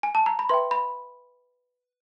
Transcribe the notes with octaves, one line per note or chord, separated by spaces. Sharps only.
G#5
A5
A#5
B5
B4 E5 G5 C6
B5